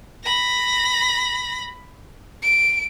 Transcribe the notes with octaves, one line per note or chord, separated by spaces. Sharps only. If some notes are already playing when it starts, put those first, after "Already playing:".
B5 A#6
D7